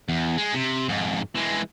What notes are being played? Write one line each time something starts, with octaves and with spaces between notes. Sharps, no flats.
E2
G#3
C3
F2 G#2
E3 G#3